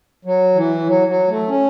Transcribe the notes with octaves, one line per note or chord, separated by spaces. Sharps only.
F#3
E3
F#3
F#3
A3
C#4